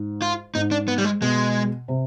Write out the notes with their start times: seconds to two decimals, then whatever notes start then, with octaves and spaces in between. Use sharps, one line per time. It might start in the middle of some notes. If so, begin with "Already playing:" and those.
Already playing: G#2
0.22 F4
0.55 G#2 D#4
0.71 D4
0.88 B3
0.98 G3
1.05 G#3
1.21 B2 G#3
1.88 C3